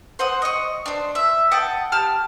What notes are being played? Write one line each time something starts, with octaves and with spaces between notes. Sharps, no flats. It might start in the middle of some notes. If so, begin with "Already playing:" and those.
C5 F#5 D#6
D#5 C#6
D4 C5
E5
F#5 G5 A5 D#6
G4 A5 F6